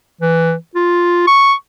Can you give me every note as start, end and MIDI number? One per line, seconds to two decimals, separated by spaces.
0.21 0.54 52
0.75 1.26 65
1.27 1.53 85